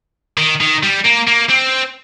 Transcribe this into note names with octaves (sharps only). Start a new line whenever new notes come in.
D#3
D#3
G3
A#3
A#3
C4